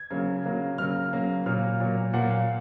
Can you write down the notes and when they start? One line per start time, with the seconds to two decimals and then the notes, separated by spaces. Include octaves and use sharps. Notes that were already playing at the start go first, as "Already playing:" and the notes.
Already playing: G#6
0.11 C#3 F#3 A#3
0.45 C#3 F#3 A#3
0.78 C#3 F#3 A#3 F6
1.13 C#3 F#3 A#3
1.46 A#2 F#3 A#3 F6
1.80 A#2 F#3 A#3
2.13 A#2 F#3 A#3 F#5
2.30 F5